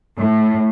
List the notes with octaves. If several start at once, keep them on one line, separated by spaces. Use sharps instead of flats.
A2